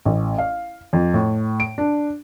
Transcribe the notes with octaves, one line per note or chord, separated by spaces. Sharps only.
A1
F5
F2
A2
D7
D4